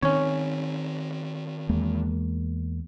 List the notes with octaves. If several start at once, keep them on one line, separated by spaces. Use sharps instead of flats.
D#3 C4 C#4 C#5
E2 G#3 A#3